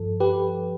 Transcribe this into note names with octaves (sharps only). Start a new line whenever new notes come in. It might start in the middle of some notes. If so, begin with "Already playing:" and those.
Already playing: G2 F3 A4
G4 B4